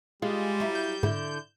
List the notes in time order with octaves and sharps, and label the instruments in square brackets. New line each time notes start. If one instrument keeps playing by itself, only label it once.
[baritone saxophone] G3 [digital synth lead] G#3 [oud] F4
[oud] F#3 E4
[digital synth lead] G6
[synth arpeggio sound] G#2 [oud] D3 E4